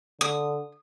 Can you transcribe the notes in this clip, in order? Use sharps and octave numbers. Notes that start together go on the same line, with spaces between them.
D3 D#6